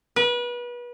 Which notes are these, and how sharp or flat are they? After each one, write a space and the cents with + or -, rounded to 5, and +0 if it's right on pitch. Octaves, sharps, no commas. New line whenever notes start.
B4 -30